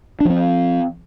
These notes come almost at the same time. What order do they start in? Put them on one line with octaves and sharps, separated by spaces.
D4 F3 C4